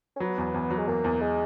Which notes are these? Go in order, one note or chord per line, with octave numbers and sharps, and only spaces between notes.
C#4
F#3 B3
E2
E2
F#3
G#3
E2 A#3
E2
G#3